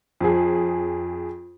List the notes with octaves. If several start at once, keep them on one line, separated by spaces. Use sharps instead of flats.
F2 G#4